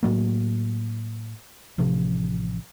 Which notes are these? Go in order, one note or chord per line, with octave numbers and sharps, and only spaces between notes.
A2 F#3 A#3
A1 C3 F3